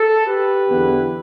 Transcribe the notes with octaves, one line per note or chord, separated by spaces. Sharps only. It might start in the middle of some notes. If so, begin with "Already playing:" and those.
Already playing: A4
G4 B4
E2 D3 B3 E4